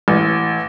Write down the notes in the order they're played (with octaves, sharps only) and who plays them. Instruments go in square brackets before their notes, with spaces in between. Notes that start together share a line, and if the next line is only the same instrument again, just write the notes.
[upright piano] A1